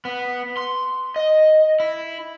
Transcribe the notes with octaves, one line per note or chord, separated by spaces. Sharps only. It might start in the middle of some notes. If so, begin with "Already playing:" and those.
B3
C6
D#5
E4